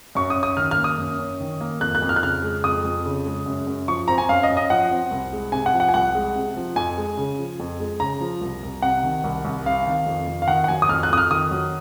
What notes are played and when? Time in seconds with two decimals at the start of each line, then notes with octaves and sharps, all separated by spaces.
0.15 F#2 C#6
0.30 D#6
0.36 C#4
0.43 D#6
0.57 D#3 F6
0.71 F6
0.78 A#3
0.84 D#6
0.98 F#2
1.19 C#4
1.40 D#3
1.61 A#3
1.81 F2 F#6
1.95 F#6
2.02 F2
2.09 F6
2.16 F#6
2.22 C#3 F6
2.42 G#3
2.64 F2 D#6
2.85 F2
3.06 C#3
3.26 G#3
3.46 F#2
3.67 F#2
3.88 F3 C#6
4.08 C4 A#5
4.18 G#5
4.29 F#2 F5
4.43 D#5
4.50 F#2
4.57 D#5
4.70 F3 F#5
4.91 C4
5.11 C2
5.33 G#3
5.52 C3 G#5
5.66 F#5
5.74 F3
5.80 F#5
5.89 G#5
5.94 C2 F#5
6.15 G#3
6.35 C3
6.57 F3
6.76 F2 G#5
6.98 G#3
7.17 C#3
7.39 F3
7.60 F2
7.79 G#3
8.00 C#3 A#5
8.21 F3
8.41 C2
8.63 C2
8.82 C3 F#5
9.03 D#3
9.24 C2
9.45 C2
9.66 C3 F5
9.86 D#3
10.06 F2
10.27 F2
10.42 F5
10.48 D#3 F#5
10.64 F#5
10.68 F#3 G#5
10.82 D#6
10.89 F2 F6
11.03 F#6
11.10 F2 D#6
11.17 F6
11.31 D#3 D#6
11.51 F#3